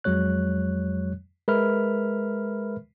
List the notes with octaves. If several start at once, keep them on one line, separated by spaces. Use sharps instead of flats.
F2 F#3 G#3 C#5 F#6
G#3 A#4 B4 E5 B5 F6